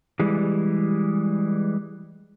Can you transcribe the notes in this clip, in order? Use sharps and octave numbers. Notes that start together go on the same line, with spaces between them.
E3 G3 G#3